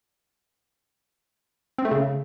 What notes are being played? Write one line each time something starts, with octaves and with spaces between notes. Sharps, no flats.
C4
A3
C#3